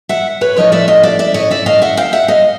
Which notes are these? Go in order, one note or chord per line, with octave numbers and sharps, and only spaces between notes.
E5 F#5
B4 C#5
A2 F3 A3 C#4 C#5 D#5
D5 E5
D#5 F5
D5 E5
D5 E5
C#5 D#5
D5 E5
D#5 F5
E5 F#5
F5 G5
E5 F#5
D#5 F5